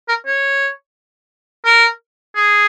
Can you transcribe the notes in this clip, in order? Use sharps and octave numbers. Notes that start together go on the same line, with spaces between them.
A#4
C#5
A#4
G#4